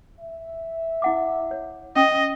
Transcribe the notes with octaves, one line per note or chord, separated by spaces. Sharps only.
E5
E4 F#5 D6
C#5
C#4 D#5 G5 D#6